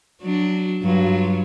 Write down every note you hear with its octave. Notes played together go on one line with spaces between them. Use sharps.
F#3 D4
G2 F#3 F4